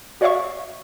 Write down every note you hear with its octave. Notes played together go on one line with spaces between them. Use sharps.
F#4 C#5 D5 E5 F5 C#6